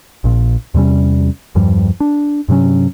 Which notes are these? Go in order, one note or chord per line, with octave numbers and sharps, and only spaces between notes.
A#1 A#2
E2 C3 G3 C#4
E2 G2 F3 G3
D4
G2 C3 F#3 C#4